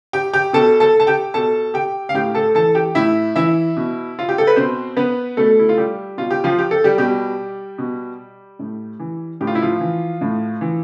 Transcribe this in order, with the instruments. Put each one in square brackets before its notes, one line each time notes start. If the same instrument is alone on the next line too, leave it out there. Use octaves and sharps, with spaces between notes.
[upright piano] G4 G5
G4 G5
B2 A4 A5
A4 A5
A5
G4 G5
B2 A4 A5
G4 G5
F5
A2 G4 G5
A4 A5
E3 A4 A5
G4 G5
A2 E4 E5
E3 E4 E5
B2
F4
G4
A4
B4
B2 C4 C5
B3 B4
B2 A3 A4
E4
F4
G3 G4
B2 F4
G4
F3 F4
G4
A4
G3 G4
B2 G3 G4
B2
A2
E3
A2 G4
F4
E4
F3 F4
E3
A2
E3